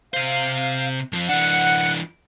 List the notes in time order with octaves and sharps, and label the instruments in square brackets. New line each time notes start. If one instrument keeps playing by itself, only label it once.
[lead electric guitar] C3 C5 [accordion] F5
[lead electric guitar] F2 F3
[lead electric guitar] E3 D4 [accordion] F#5